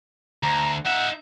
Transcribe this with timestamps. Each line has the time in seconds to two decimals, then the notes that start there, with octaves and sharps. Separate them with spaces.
0.43 D2 A#5
0.85 D#4 E5 F#5